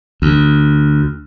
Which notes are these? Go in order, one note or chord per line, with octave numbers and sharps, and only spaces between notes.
D2